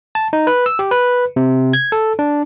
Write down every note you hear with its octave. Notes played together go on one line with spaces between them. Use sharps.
A5
D#4
B4
E6
G4
B4
C3
G#6
A4
D4